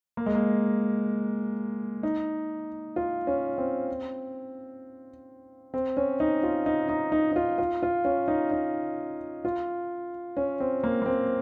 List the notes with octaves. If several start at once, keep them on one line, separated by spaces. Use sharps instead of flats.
A#3
G#3
A#3
D#4
F4
C#4
C4
C4
C#4
D#4
F4
D#4
D#4
D#4
D#4
F4
F4
F4
C#4
D#4
D#4
F4
C#4
C4
A#3
A#3
C4